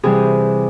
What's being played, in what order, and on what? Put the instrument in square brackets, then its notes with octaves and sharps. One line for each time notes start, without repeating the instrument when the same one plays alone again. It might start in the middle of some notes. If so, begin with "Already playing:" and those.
[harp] C3 E3 G3 G#4